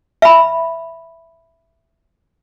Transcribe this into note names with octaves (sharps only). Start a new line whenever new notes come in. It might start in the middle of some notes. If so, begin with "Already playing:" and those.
E5 B5